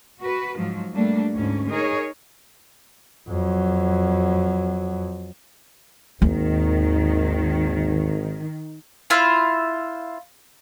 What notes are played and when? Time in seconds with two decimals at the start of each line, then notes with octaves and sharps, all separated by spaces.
0.21 F#4 B4
0.57 G#2 F3 F#3
0.92 G3 A3 A#3 D4
1.35 D2 G#2 C#4
1.70 D#4 G#4 A#4 C#5
3.29 F2 F#3
6.22 G#1 D#2 D#3
9.10 E4 F4 C5 F5